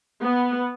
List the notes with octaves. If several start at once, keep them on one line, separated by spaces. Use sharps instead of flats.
B3